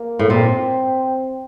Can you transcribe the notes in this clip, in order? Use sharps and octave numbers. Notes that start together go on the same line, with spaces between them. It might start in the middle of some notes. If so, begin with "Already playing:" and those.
Already playing: A#3
A2
A#2 C4